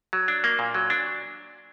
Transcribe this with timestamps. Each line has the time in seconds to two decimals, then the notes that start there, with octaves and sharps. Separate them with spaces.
0.13 F#3
0.28 D4
0.44 A#3
0.59 A#2
0.74 F#3
0.90 D4